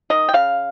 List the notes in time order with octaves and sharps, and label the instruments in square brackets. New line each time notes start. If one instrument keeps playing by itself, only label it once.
[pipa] D#3 D#5
G5
C#3 F5